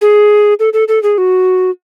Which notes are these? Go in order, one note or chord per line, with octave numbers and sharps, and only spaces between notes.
G#4
A4
A4
A4
G#4
F#4